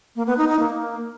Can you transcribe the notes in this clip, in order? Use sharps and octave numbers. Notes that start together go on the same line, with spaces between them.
A#3
B3
D#4
D#4
A#3